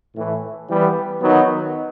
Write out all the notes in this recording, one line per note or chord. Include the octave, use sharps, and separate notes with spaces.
A2 E3 A3
E3 G3 B3
D#3 F#3 B3 D#4